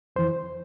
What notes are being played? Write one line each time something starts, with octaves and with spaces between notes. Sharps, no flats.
F2 E3 C5